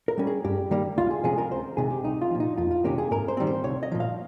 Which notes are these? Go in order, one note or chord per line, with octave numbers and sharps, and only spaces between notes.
A#4
G3 C#4
G#4
G2 G4
D#3 G3 A#3
C#2 F4
G#4
C3 F3 G#3 C#4 G#4
A#4
C#2 C5
C3 D#3 G#3 G#4
G4
C2 D#4
F4
A#2 F3
D#4
F2 F4
F4
C3 D#3 A#3 C#4 G4
G#4
G#2 A#4
C5
D#3 G3 C4
C5
C2 C#5
D#5
A#2 F3
F5